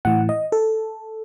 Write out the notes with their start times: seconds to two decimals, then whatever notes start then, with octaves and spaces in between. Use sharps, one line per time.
0.05 A2 E3 F#5
0.29 D#5
0.52 A4